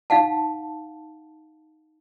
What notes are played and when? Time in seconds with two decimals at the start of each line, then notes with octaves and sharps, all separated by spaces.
0.10 D#4 F5 F#5 A5